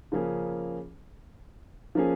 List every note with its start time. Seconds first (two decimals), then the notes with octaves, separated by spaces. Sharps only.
0.12 C#3 F3 A#3 C#4 G#4
1.95 F3 A#3 C#4 G#4